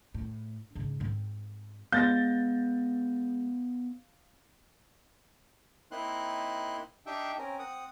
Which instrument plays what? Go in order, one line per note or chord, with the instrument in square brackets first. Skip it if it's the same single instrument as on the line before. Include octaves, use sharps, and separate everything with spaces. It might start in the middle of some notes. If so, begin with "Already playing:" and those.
[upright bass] A2
G#2 C#3
G#2 C4
[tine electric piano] G#3 [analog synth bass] B3 [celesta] F5 [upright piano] G6 A6 A#6
[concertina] A#3 C4 D#4 E4 C6 F#6
D4 D#4 G4 E5 G5
C4 C#4 A#4
C4 F#5 D#6